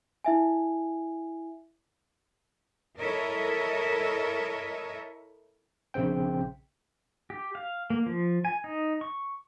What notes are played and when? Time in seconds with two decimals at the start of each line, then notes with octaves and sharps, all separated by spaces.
0.24 E4 E5 G#5
2.98 E4 A4 A#4 C#5 D#5 E5
5.94 A#1 C#3 C4 G5
7.30 G4
7.55 F5
7.90 A#3
8.06 F3
8.45 G#5
8.64 D#4
9.01 C#6